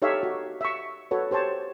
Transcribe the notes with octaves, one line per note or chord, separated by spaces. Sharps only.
D#4 G4 A4 C#5 E5 F5
F#4
E5 C#6
F#4 A4 B4 C#5
G4 C5 C#5 A5